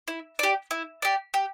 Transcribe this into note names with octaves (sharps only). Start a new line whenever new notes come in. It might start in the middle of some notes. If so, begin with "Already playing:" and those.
E4
G4 D5
E4
G4 D5
G4